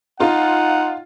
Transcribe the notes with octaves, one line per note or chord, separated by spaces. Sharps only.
D#4 F4 F#5